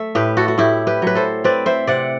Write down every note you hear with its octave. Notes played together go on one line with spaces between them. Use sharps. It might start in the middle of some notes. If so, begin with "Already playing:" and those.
Already playing: A3 E5
A2 G4 B4
F#4 A4
F#4
A2 E4 G4
G4 B4
F#3 B4
A4 C5
C4 B4 D5
C5 E5
C3 D5 F#5